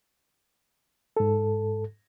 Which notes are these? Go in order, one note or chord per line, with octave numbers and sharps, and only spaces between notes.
G#2 A4